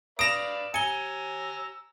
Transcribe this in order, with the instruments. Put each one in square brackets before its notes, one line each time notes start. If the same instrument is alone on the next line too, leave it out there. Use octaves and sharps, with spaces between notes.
[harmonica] B4 D5 F5 [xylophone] D#6 A#6 F7 [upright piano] D7 E7
[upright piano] G#5 [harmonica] A#5 E6 [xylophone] C#7 G7